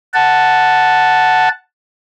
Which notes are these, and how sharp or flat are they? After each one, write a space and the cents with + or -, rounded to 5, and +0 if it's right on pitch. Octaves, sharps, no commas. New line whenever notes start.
F#5 +0 A5 +0